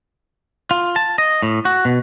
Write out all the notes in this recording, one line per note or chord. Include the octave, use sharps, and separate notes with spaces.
F4
A5
D#5
A2
F#4
B2